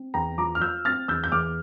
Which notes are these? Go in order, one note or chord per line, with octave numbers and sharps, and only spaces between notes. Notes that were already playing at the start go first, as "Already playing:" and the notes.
Already playing: C4
E2 G5 A#5
F3 A#5 D6
F6
F3 E6 G6
C4 F6 A6
E2 E6 G6
G6
E2 D6 F6